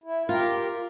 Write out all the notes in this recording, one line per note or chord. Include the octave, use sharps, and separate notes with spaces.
E4
F4 G4 A#4